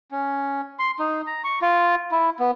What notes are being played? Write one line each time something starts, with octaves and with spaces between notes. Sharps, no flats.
C#4
C6
D#4
A#5
C#6
F4
E4
B3